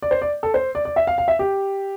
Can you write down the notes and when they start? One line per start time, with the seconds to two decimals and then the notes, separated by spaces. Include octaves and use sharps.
0.02 D5
0.11 C5
0.22 D5
0.43 A4
0.54 C5
0.75 D5
0.85 D5
0.96 E5
1.07 F5
1.18 F5
1.28 E5
1.39 G4